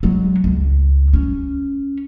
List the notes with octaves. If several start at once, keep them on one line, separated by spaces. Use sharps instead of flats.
F#3 G#3
C#2
C#4